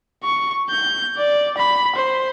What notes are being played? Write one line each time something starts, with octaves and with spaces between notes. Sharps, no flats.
C#6
G6
D5
B5
C5